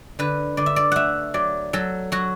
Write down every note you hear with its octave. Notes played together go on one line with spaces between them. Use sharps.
D3 B4
D3 D5
E5
D5
A3 E5 F#5
F#3 D5
F#3 A4
F#3 F#4